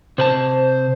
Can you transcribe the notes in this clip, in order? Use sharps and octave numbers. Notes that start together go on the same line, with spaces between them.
C3 B4 C5 A5